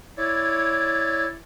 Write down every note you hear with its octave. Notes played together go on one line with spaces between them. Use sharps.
E4 C#5 D5